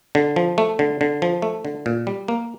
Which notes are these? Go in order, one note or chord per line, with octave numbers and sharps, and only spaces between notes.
D3
F3
A3
D3
D3
F3
A3
D3
A#2
G3
A#3